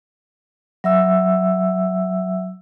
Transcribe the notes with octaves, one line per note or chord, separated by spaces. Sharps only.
F#3 E5 E6